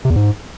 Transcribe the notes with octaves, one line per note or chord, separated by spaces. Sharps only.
C3
E2
G#2